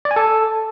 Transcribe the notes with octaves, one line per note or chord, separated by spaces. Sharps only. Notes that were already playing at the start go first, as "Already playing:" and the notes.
D5
G#5
A4